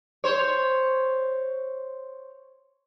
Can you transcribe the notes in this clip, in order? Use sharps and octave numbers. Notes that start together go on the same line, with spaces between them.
C5 C#5